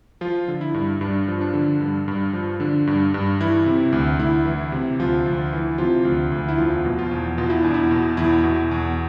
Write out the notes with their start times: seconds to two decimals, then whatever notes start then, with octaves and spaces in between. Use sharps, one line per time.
0.21 F3 F4
0.48 D3
0.61 E4
0.74 G2
1.01 G2 D4
1.28 F3
1.41 D4
1.54 D3
1.81 G2
2.08 G2
2.33 F3
2.60 D3 D4
2.87 G2
3.14 G2
3.40 E3 E4
3.66 C3
3.92 D2
4.19 D2 E4
4.46 E3
4.72 C3
4.99 D2 F3 F4
5.26 D2
5.53 E3
5.78 C3 F3 F4
6.05 D2
6.32 D2
6.48 E4
6.58 E2 F3 F4
6.85 B2
6.99 F3 F4
7.11 E2
7.38 B2 F4
7.50 E4
7.62 E2 D4
7.74 E4
7.91 B2
8.17 E2 E4
8.44 B2
8.71 E2